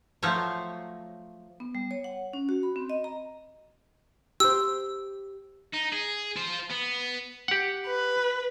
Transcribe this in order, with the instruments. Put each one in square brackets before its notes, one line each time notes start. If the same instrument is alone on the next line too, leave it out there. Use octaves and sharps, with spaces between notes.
[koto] F3 F#3 A3 F4 C5 C#5
[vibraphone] B3
G3
C#5
F#5
C#4
F#4
B5
C4
D#5
A#5
[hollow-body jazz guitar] G4 C5 [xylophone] E6
[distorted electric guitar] D#4
G#4
F4 C5
B3
[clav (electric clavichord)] G4 F#5
[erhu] B4